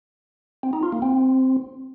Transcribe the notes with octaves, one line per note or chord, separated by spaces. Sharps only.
C4
D#4
F4
A#3
C4